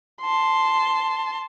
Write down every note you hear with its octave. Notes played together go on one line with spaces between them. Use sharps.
A5 C6